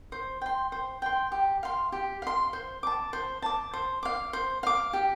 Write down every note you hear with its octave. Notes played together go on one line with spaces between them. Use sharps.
C5
G5 C6
C5
G5 C6
G4
F5 C6
G4
F5 C6
C5
A5 D6
C5
A5 D6
C5
F5 D6
C5
F5 D6
G4